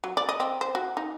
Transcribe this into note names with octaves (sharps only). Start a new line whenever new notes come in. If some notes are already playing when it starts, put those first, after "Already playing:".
F#3
D5
D#5
C4
C5
F#4
D#4